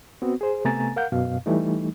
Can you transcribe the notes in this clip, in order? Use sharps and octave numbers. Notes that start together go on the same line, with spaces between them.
B3 C4 F#4
G#4 C5
C3 A3 B3 G#5 A#5 A6
A#4 F5 F#5 G6
F#2 B2 F5
E3 G3 A3 D#4